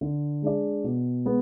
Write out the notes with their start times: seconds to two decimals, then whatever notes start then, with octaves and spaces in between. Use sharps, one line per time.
0.01 D3
0.42 G#3 D4 G#4 D5
0.84 B2
1.25 G#3 B3